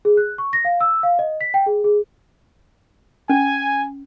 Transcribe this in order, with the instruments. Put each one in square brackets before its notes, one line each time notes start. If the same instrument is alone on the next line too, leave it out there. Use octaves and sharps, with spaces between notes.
[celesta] G#4
F#6
C#6
A#6
F5
E6
F5
D#5
B6
G5
G#4
G#4
[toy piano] C#4 [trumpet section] G#5